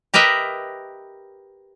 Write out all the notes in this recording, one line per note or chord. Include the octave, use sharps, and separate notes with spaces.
G4 A#4 B4 D#5 E5